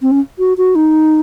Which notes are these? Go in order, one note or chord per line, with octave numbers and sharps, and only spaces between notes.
C4
C#4
F#4
F#4
D#4